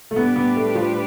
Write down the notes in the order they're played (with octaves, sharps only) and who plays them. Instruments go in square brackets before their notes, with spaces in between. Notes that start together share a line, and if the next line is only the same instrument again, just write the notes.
[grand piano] A3
[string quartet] A2 G3 D4 G4 B4 [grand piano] B3
[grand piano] B3
A3
F3